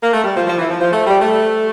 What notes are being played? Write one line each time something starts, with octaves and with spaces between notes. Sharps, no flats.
A#3
A3
G3
F3
F3
E3
F3
F3
A3
G3
A3